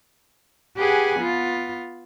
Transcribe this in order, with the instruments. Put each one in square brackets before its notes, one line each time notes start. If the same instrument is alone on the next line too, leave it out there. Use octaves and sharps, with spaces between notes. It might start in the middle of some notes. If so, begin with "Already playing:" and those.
[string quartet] G4 G#4 B4 F#5 G#5
B3 F4